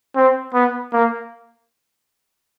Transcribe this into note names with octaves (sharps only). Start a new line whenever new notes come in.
C4
B3
A#3